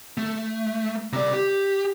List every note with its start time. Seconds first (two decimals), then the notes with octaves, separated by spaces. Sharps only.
0.18 A3
1.13 C3 D5
1.33 G4